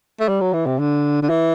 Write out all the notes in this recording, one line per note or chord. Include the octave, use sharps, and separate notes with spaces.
A3
G3
F#3
E3
C3
D3
D3
E3